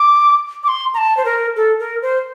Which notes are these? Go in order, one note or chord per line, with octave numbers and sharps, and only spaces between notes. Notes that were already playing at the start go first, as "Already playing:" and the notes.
Already playing: D6
D6
C6
A#5
A5
C5
A#4
A4
A#4
C5